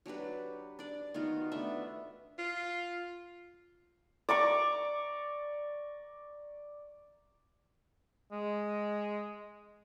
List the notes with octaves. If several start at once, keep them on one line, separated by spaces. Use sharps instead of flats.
F#3 D4 G4 B4
D4 D5
D#3 B3 F4 F#4
A3 B3 D4 E5
F4
D5 A#5 C#6 D6
G#3